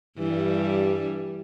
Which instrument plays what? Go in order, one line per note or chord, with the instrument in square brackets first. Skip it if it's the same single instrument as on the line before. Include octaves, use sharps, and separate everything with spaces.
[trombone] G2 [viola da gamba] E3 G3